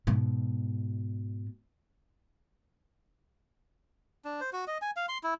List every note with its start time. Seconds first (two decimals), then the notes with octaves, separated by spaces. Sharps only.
0.07 G#2 B2
4.25 D4
4.41 C5
4.53 F#4
4.68 D#5
4.82 G#5
4.96 F5
5.09 C6
5.23 E4